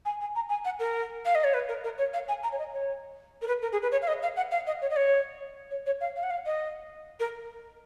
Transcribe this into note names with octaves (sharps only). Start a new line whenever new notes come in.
G#5
G#5
A#5
G#5
F#5
A#4
F5
D#5
C#5
B4
A#4
A#4
C#5
F5
G#5
A#5
C#5
D#5
C#5
A#4
B4
A#4
G#4
B4
C#5
F5
D#5
F5
F#5
F5
D#5
C#5
D#5
C#5
C#5
C#5
F5
F5
F#5
F5
D#5
A#4